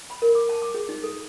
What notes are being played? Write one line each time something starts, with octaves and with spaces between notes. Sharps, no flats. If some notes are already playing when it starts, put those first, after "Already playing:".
B5
A#4
D6
A5
D6
G#4
D#4
A4